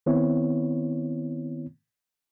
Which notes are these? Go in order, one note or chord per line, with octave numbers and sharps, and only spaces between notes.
D#3 B3 C4 E4 C#5